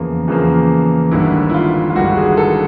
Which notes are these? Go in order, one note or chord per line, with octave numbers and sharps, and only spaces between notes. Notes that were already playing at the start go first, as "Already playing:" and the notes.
Already playing: E2 C#3 F3 A#3
E2 C#3 F3 A#3
G#1 G2 D3 E4
E4
F4
F4
G#1 G2 D3 F#4
G#4
A4